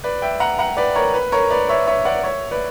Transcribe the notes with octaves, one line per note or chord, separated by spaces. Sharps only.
B4 D5
E5 G5
F#5 A#5
F#5 A#5
B4 D5
A#4 C#5
B4
A#4 C#5
B4 D5
C#5 E5
C#5 E5
D5 F#5
C#5 E5
B4 D5